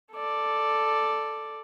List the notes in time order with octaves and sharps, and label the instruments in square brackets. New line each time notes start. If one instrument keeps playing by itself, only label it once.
[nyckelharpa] A4 D5